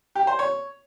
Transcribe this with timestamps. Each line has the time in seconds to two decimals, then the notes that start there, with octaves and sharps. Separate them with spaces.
0.15 G4
0.27 C5
0.39 C#5